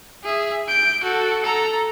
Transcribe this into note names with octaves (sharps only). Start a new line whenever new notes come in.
G#4 E5
G6 D7
F#4 A4
A4 A#5